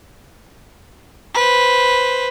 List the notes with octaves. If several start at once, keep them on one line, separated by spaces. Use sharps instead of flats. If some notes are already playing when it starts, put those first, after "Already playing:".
B4 C5